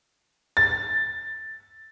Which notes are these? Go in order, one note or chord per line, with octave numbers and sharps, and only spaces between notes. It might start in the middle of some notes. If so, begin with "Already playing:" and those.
A6